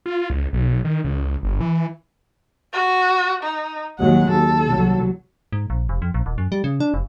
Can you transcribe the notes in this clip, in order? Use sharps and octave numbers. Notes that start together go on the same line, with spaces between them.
F4
C#2
B1
D#3
C#2
G1
E3
F#4
D#4
D#2 F#3 G#3 F#5
D#2 A4
C2 F#3
G#2
A#1
F1
F2
A#1
D#1
F#2
G3
C#3
D4
F1